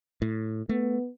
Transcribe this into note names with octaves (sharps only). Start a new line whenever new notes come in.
A2
A3 B3